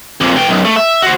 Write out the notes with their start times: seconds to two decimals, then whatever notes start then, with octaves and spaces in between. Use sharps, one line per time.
0.21 F2 A#2
0.36 E3 G5
0.49 B1 F#2
0.65 A3
0.76 E5
1.03 F#4 C5